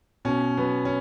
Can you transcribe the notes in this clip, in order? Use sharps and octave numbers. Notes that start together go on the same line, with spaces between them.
B2 C#4
F#3 B3
C#4